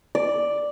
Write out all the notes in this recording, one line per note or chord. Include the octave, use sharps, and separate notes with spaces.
D5